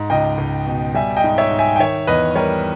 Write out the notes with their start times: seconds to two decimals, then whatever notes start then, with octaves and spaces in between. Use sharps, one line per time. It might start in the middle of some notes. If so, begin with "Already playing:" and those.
Already playing: G#2
0.10 C#2 D#5 G5
0.38 C#2
0.67 B2
0.94 G3 E5 G#5
1.16 D#5 G5
1.24 G#2
1.38 C#5 E5
1.51 G#2
1.59 E5 G#5
1.76 G5
1.79 D#3 C#5 E5
2.07 E2 B4 D#5
2.36 G3 A#4 C#5